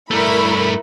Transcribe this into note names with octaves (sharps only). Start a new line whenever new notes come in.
G2 A3 E4 A#4 B5